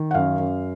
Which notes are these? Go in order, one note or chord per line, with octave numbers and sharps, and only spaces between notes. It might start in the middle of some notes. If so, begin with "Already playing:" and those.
Already playing: D#3
F#5
F#2 F5
F#2